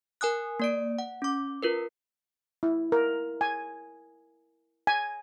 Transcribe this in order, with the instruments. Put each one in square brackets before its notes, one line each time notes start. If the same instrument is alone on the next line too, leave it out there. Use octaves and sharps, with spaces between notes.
[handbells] A#4 G#5 D#6 F#6
A#3 D5 D7
F#5
C#4 D6
F4 A#4 B4
[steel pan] E4
A#4
G#5
G#5